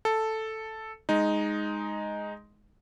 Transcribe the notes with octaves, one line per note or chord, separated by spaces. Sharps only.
A4
G#3 D#4